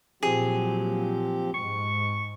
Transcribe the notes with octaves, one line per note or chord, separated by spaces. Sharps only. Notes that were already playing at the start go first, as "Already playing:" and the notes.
A#2 F3 F#3 C4 G4 G#4
G#2 C#6